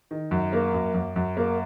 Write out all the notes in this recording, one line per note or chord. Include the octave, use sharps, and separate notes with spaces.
D#3
F#2
A#3
F#2
F#2
F#2
A#3